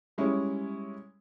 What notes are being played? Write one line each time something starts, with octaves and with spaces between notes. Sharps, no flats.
G3 G#3 C#4 E4 C#5